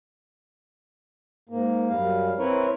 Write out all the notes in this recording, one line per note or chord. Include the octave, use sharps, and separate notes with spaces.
G#2 A#3
F#2 G3 F5
C4 E4 A#4 B4 C#5